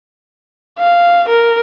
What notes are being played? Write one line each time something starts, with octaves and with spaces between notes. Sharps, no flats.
F5
A#4